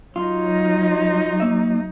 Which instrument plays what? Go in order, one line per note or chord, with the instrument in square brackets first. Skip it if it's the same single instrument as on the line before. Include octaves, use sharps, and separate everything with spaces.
[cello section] F#3 D#4 [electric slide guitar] F4
[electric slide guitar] A#3 E5